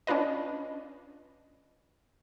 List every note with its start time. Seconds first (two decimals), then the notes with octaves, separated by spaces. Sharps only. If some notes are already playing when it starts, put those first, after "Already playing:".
0.07 C#4 D4 F4 B4 D#5